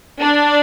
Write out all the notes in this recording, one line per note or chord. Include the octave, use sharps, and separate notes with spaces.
D4